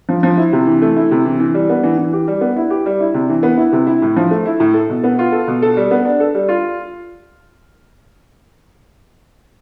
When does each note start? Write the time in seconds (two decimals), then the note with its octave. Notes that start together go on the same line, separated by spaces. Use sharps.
0.09 F3
0.23 F3
0.37 E4
0.53 C3
0.67 E3
0.82 A3
0.96 E4
1.11 C3
1.25 E3
1.40 E3
1.54 G3
1.69 B3
1.83 E3
1.97 E3
2.13 G4
2.28 G3
2.41 B3
2.56 E4
2.70 G4
2.86 G3
3.00 E4
3.14 C3
3.29 E3
3.43 B3
3.57 E4
3.73 C3
3.87 E4
4.02 A2
4.16 F3
4.31 A3
4.46 E4
4.60 A2
4.74 A4
4.90 B2
5.04 B3
5.19 F4
5.32 A4
5.48 B2
5.62 A4
5.77 G3
5.91 B3
6.05 D4
6.20 A4
6.35 G3
6.48 F4